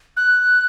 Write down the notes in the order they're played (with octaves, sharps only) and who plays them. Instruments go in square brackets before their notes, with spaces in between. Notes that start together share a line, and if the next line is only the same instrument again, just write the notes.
[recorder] F#6